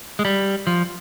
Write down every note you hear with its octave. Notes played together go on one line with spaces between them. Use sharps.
G#3
G3
F3